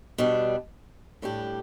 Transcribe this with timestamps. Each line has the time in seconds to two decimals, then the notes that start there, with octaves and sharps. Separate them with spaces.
0.18 B2 G3 D4
1.22 A2 G3 D4 G4